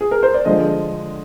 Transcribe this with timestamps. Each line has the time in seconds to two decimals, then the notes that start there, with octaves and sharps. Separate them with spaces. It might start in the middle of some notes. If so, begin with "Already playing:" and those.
0.01 G#4
0.11 A#4
0.23 C5
0.34 D5
0.45 D3 F3 G#3 D#5